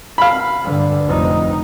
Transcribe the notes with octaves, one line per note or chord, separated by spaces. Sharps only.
F5 B5
G2 D3
F1 D#4